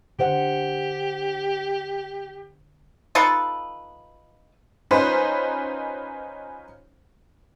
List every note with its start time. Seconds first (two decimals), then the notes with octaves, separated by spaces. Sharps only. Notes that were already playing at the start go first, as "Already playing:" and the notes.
0.19 D3 G4 C5 F#5
3.15 D#4 F4 A4 B4
4.91 C#4 D#4 F4 B4 C5